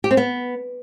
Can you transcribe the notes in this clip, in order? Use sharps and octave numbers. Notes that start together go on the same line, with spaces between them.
G4
C4
B3